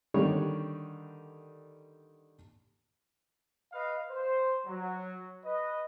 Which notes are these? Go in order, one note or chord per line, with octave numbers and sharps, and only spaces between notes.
D3 D#3 G3 C#5
B4 D#5 F5
C5
F#3
B4 D#5